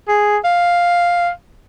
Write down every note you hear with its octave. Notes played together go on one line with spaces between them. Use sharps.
G#4
F5